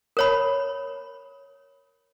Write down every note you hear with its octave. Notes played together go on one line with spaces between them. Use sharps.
A#4 C#5 B5